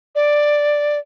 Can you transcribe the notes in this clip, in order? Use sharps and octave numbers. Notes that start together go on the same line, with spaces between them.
D5